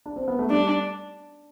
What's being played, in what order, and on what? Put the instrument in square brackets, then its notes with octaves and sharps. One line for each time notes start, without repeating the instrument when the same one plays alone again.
[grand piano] D4
C4
B3
A3
[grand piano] G3 [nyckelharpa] D4